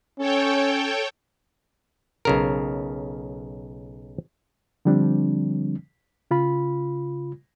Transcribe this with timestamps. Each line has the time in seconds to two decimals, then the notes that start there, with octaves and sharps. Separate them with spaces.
0.18 C#4 A4 C#5 G5
2.25 B1 C#3 A#4
4.85 D3 F3 G3 C4 D4
6.31 C#3 F4 B5